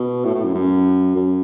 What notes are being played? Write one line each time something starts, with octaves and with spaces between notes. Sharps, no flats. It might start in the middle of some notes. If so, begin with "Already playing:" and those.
Already playing: B2
A2
A2
F#2
F#2
F#2